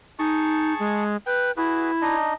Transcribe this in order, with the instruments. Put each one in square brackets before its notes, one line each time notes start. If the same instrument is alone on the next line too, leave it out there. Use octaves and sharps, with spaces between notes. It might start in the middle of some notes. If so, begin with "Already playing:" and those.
[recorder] D#4 [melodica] G#4 A5 C#6
[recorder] G#3
[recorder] B4 [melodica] G5
[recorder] E4 [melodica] F#4 G#4 B4
[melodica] D4 D#4 D#5